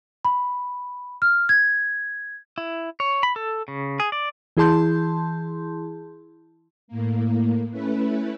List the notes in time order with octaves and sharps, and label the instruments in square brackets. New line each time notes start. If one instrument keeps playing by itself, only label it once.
[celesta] B5
F6
G#6
[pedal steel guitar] E4
C#5
B5
A4
C#3
G#4
D5
[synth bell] E3 E4 G#4 A5 C6 G6
[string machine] A2 A#3
A3 C#4 E4 B4